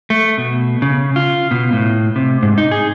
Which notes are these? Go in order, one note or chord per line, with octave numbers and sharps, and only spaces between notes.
A3
B2
C#3
F4
B2
A2
C3
G#2
D#4
G#4